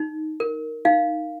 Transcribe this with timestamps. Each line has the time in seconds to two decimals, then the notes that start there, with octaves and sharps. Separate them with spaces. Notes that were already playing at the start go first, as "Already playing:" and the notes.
Already playing: D#4
0.40 A#4
0.85 D#4 F5